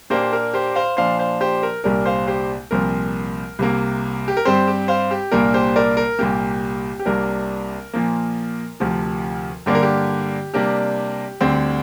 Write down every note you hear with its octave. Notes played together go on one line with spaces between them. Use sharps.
A#2 A#3 D4 G4 C5
A#4
G4 C5
C5 F5
A#2 F3 D4 C5 F5
C5 F5
G4 C5
A#4
C2 A#2 G3 D4 A#4
C5 F5
G4 C5
C2 A#2 F3 C4 A#4
C2 C3 A#3
G4
A#4
G2 G3 C4 G4 C5
G4
C5 F5
G4
C2 A#2 A#3 D4 A#4
G4 C5
A#4 D5
A#4
C2 A#2 A#3 G4
G4
C2 C3 A#3 D4 A#4
A#2 F3 A#3
D2 C3 F3
G2 D3 A#3 D4 G4
A#4
G4
C3 G3 A#3 D4 G4
D2 D3 G3 C4